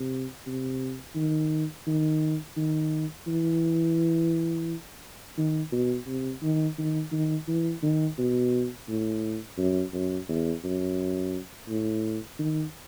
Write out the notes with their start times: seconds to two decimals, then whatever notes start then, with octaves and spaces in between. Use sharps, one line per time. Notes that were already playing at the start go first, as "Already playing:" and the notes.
Already playing: C3
0.47 C3
1.16 D#3
1.87 D#3
2.57 D#3
3.27 E3
5.38 D#3
5.72 B2
6.07 C3
6.43 D#3
6.78 D#3
7.12 D#3
7.48 E3
7.83 D#3
8.18 B2
8.89 A2
9.58 F#2
9.93 F#2
10.28 E2
10.64 F#2
11.69 A2
12.39 D#3